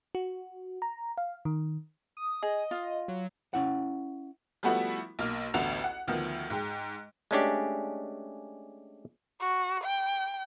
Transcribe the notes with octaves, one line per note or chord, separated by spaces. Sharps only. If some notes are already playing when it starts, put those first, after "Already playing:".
F#4
A#5
F5
D#3
D#6
G#4 D#5
F4
F#3
C#4 E4 F#5
F3 G3 A3 B3 E4 F#4
B1 A#3 F6
A1 D2 D3 B3 F#4 F7
F#5
D2 D#3 F3 B3
G#2 G#3 G5
G#3 A3 C#4 D4 G4
F#4
G5